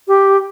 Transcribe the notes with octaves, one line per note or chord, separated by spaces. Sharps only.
G4